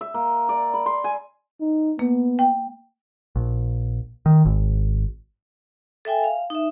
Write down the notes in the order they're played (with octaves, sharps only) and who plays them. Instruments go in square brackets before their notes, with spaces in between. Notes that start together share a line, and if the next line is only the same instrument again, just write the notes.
[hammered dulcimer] E5
A#3
D5
B5
C6
G#5
[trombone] D#4
[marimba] A#3 [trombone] B3
[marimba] G5
[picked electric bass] A#1
D#3
G#1
[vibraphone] A4 E5 G5 G#5
F5
D#4 E5